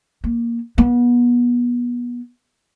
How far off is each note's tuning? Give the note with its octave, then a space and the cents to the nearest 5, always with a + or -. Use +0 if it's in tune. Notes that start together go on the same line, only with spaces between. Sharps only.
A#3 +5
B3 -30